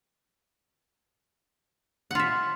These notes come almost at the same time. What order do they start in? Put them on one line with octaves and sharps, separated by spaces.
F#5 F4 E5